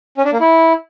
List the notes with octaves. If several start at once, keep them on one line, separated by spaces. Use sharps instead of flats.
C#4
D4
A#3
E4